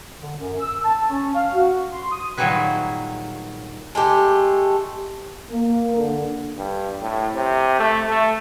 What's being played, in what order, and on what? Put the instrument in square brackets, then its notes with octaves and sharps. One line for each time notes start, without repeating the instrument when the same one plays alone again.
[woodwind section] D3
F#2
E6
A5
C#4
F5
F#4
C6
D#6
[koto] A#2 D#3 F#3 G3 G#4 B4
[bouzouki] G#3 A3 G4
[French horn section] A#3
D3
[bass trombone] G2
A2
C3
A3
A3